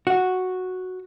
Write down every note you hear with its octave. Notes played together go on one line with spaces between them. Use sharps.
F#4